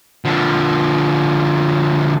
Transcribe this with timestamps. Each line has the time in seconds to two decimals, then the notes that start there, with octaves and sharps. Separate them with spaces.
0.25 D3 F3